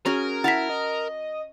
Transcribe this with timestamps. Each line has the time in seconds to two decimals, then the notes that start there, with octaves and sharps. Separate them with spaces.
0.06 C#4 F#4 G#4 A#4
0.44 E4 F#5 A5 A#5 C#6 B6
0.69 D#5